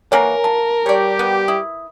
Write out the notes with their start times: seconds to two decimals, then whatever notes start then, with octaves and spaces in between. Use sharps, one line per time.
0.12 E3 A#3 F#4 A#4 C#5 G#5 A#5
0.44 F4 A5
0.86 G3 G4 C#5 D5
1.19 B3
1.48 E4 D#6